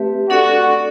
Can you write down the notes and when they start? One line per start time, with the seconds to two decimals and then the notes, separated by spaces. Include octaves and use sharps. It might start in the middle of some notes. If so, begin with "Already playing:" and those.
Already playing: A3 C4 G4 B4 E5
0.29 D4 F#4 A4 D5 F#5